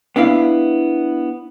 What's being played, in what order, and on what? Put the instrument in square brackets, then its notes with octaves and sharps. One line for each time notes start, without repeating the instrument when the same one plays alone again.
[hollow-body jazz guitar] B3 D4 E4 F5